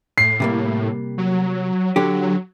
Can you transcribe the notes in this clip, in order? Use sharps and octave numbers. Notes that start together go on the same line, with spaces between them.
A2 C7
C3 G3 A#3
F#3
D3 F#3 G4